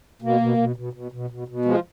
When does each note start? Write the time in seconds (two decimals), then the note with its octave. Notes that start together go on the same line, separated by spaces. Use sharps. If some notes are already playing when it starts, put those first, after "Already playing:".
0.22 B2 A#3
0.41 B2
0.57 B2
0.76 B2
0.93 B2
1.12 B2
1.30 B2
1.48 B2
1.65 F3 G#3